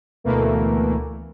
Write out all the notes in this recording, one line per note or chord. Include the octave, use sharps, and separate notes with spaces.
D2 B2 E3 A3 A#3